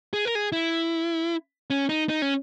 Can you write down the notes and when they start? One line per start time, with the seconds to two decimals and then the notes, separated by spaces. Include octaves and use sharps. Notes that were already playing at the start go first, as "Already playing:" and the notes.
0.13 G#4
0.25 A#4
0.35 G#4
0.52 E4
1.70 C#4
1.89 D#4
2.09 D#4
2.22 C#4